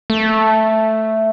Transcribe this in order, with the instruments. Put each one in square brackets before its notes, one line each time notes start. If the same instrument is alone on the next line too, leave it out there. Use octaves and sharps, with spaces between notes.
[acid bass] A3